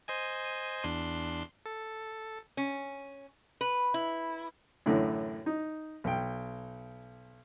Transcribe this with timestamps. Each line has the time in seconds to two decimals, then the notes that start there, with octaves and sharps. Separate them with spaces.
0.08 C5 D#5 G#5
0.84 E2 D4 C6
1.66 A4
2.57 C#4
3.61 B4
3.94 E4
4.86 F#2 A2 D3 E3
5.46 D#4
6.04 B1 G5